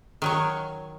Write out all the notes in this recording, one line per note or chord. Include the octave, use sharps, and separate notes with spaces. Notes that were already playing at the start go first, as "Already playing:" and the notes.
D#3 F#3 C#5